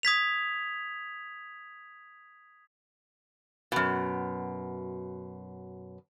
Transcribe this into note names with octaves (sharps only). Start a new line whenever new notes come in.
D#6 G#6 B6 F7
F#2 B2